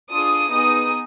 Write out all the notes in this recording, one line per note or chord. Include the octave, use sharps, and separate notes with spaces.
D4 F4 G#4 D#6
B3 D#4 G#4 D#6